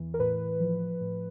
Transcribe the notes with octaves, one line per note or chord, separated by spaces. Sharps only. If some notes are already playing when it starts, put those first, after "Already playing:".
Already playing: E2 E3
A#4
A2 B4
F3
A2